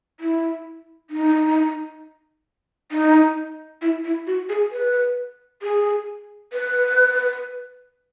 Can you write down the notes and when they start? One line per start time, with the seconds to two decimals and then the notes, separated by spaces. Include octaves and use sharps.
0.20 E4
1.10 D#4
2.92 D#4
3.82 E4
4.04 E4
4.27 F#4
4.49 G#4
4.72 B4
5.62 G#4
6.53 B4